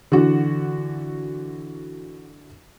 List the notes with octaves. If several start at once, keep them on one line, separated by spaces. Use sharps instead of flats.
D3 E3 F#4